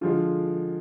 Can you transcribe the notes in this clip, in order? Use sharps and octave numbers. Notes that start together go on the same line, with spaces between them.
D3 F3 G#3 F4